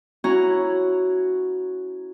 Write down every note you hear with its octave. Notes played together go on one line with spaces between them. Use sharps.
C#4 E4 F#4 A#5